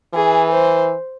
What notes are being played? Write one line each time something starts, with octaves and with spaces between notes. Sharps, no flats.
E3 G#4
C5